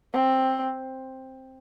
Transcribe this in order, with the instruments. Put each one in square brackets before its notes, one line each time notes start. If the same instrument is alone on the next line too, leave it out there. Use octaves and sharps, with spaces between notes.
[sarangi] C4